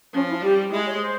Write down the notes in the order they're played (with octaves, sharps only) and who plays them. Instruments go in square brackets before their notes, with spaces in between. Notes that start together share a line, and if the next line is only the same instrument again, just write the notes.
[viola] F3 [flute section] C#4
[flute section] E4
[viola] G3 [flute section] G4
[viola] G#3 [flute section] E4
[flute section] C#5
C5